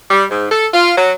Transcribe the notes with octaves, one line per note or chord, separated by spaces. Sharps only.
G3
G#2
A4
F4
F#3